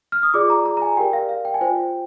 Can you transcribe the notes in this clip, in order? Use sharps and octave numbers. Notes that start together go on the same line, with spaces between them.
F6
D#6
F4 G#4 D5 D6
A#5
A#5
A#5
G#5
G4 A#4 D5 G5
F5
F5
G5
G#5
F4 C5 G5